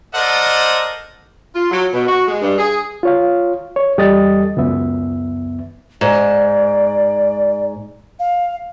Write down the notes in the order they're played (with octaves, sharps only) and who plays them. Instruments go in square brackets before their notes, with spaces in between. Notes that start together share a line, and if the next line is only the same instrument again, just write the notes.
[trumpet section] A4 A#4 C5 D5 D#5 F#5
[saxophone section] F4
F#3
B2
F#4
G#3
G2
G#4
[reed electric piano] F4 C#5 F5
C#5
E2 G3 A4 D#5 D#6 A6
C#2 F#2 B3 E5
[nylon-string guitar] G#2 [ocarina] D5
[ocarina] F5